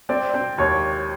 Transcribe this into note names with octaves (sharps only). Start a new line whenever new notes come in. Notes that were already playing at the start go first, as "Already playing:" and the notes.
C4 D5
C4 C5
D#2 C#5